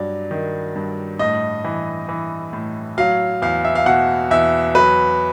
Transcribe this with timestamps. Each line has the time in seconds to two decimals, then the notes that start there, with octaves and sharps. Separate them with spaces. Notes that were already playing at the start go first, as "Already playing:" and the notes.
Already playing: G2 F#3 D5
0.31 D#3
0.75 G2
1.19 A2 D#5
1.64 E3
2.09 E3
2.53 A2
2.98 F#3 F5
3.42 E2 F5
3.65 E5
3.75 F5
3.86 B2 F#5
4.31 E2 E5
4.75 F#3 B4